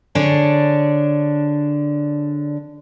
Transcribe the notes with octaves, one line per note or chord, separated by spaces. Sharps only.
D3 D4 G#4 C#5